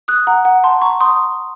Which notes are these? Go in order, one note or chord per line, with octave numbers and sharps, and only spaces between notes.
D#6 F#6
F#5 A#5
F#5
A5 C6
A#5 C#6
C6 D#6